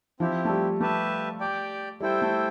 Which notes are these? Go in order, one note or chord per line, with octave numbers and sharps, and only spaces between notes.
F3 C4 E4 G4
A3
G3
A3 G4 B4 E5 A5
G4 D5 G5
G3 E4 A4 C5 G5
A3